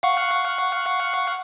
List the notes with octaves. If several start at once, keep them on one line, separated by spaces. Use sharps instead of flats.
F5 F#5 C#6